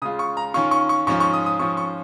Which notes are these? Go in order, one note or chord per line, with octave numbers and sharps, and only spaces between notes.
C#3 G#3 F4 D#6
C#6
A#5
D#3 C#4 F4 C#6
C#6
C#6
G#2 F3 C#4 F4 C#6
C#6
D#6
D#6
G#2 F3 C#4 F4 C#6
C#6